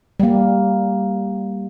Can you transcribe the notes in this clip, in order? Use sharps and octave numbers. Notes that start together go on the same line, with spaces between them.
G3 A#3